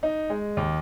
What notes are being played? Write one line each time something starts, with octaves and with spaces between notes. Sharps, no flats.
D#4
G#3
D#2